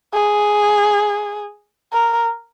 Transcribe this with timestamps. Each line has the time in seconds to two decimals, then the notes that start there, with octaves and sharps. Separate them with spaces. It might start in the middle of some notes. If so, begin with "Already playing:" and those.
0.14 G#4
1.93 A#4